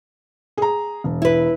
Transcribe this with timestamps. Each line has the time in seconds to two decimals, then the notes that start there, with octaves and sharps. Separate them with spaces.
0.58 G#4 A#5
1.04 E1
1.22 E4 B4